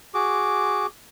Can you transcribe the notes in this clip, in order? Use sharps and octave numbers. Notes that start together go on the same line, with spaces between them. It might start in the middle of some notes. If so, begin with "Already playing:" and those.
F#4 G#4 D6